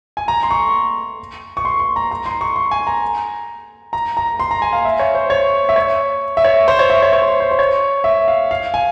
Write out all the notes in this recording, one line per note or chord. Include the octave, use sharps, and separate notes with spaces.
G#5
A#5
C6
C#6
C#6
C6
C6
A#5
A#5
C6
C#6
C6
G#5
A#5
A#5
A#5
C6
A#5
G#5
F5
E5
C#5
C5
C#5
E5
C#5
E5
C#5
C5
C#5
E5
C#5
C#5
C5
C5
C5
C#5
E5
F5
F5
G#5